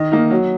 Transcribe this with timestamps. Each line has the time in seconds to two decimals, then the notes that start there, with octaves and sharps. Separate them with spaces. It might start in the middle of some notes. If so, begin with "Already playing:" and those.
Already playing: D#3 D#5
0.12 A#3 D#4
0.31 F#3